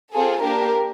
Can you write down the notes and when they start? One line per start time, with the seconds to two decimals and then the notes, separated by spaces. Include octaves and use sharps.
0.13 C4 F4 G#4 A4
0.42 A#3 D4 G4 A#4